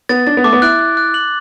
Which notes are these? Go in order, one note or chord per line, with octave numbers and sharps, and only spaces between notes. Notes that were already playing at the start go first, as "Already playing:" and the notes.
B3 A6
D4 A6
B3
A3 D6
B3
E4 F#6
F#6
F#6
F#7